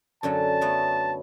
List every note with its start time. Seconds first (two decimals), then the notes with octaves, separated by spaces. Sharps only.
0.23 F#2 D3 F#3 A5
0.61 F#3 A3 B3